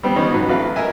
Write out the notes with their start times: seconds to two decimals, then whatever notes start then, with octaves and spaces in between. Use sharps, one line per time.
0.03 G3 B3 C4
0.16 F3 G3 B3 C#4 D#4
0.31 G#2 F#3 B4
0.49 A1 F#4 B4 F5
0.76 A#4 D#5 E5 G#5